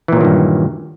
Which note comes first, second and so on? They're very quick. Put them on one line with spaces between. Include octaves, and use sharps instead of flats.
E3 A#2 F#3 D#3 G2